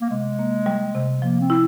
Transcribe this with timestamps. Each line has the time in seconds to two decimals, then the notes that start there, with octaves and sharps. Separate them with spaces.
0.01 A#3
0.10 C3 G#3
0.39 A#3
0.66 G3
0.95 C3
1.22 F3 A#3
1.40 C4
1.50 E4